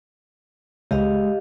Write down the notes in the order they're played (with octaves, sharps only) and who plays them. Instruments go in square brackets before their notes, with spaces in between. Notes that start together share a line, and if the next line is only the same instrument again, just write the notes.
[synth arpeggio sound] C#2 C#3 [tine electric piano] G#3 [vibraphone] G4 D#5 F5